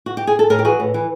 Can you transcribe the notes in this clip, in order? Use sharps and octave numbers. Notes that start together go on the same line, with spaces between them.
F#4
G4
G#4
A4
A2 G#4 A#4
G4
E3 F#4 G#4
A2
E3